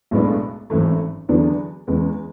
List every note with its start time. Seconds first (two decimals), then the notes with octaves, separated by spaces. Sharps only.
0.11 B1 A2 G#3 B3 D4
0.70 G#1 F#2 E3 A3
1.29 E2 D3 F#3 B3 D4
1.87 E2 C#3 G#3 B3